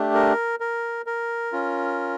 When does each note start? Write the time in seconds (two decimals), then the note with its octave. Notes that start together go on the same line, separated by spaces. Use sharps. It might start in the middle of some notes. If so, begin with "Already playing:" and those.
Already playing: A3 D4 G4
0.14 A#4
0.60 A#4
1.07 A#4
1.53 C#4 F4